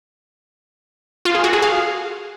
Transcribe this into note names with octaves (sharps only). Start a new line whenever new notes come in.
F4
G#4
F#4
G#4
F5